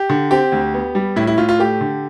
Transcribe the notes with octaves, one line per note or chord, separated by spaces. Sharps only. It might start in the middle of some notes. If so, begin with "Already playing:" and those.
Already playing: G4
D3
C4 G4
D2
B3
G3
A2 E4
E4
A2 F4
F4
A3 G4
D3